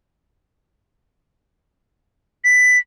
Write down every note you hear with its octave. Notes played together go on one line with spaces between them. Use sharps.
B6